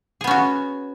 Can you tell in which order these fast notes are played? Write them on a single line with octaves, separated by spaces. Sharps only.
G#4 B3 C#4 F#4